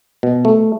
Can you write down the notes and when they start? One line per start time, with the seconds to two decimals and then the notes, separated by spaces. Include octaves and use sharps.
0.23 B2
0.45 A3